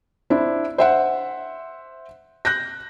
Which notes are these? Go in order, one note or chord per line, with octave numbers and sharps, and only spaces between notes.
D4 E4 C5
C5 E5 F#5
F#6 G6 A#6